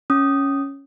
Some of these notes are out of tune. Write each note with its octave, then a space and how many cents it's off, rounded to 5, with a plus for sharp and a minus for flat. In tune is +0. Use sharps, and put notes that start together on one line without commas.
C#4 +0 D#6 +0